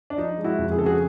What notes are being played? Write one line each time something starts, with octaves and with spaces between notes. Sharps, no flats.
D4
F3 D#4
G#3
E4 F#4
F2
G#4
C#3 A4
F#4 G#4